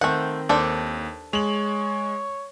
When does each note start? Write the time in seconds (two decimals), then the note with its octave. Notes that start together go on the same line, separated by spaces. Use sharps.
0.01 D#3 A3 C4 F#5
0.49 D#2 D4 A4 C5
1.33 G#3 C#5 F7 F#7